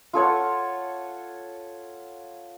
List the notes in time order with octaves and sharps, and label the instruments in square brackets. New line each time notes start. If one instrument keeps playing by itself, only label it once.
[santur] F4 A4 C#5 F#5